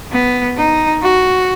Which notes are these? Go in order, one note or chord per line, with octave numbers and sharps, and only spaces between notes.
B3
D#4
F#4